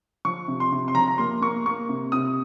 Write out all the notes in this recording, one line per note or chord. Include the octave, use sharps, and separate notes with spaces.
F3 C#6
C3
C6
C3
C6
F3 A#5
A#5
A#3 C6
A#3 C#6
A#3 C#6
C3
C3 D#6